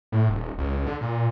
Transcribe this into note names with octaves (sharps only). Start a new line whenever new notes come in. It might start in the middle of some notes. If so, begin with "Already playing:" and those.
A2
D#1
C#2
D3
A#2